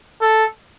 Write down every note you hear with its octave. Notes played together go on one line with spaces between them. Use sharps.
A4